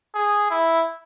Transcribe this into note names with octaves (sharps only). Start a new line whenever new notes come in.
G#4
E4